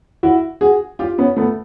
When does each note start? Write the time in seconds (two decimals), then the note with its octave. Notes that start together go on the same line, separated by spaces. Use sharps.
0.23 E4 F#4
0.61 F#4 G#4
0.99 F4 G4
1.18 B3 C#4
1.37 A3 B3